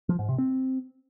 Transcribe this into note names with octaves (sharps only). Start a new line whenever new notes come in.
F3
G#2
C3
C4